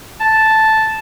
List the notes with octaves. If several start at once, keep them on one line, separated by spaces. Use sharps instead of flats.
A5